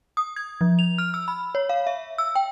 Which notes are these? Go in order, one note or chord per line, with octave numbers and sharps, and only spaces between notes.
D#6
G#6
F3
F7
F6
E6
B5
C#5
F5
E5
E6
G5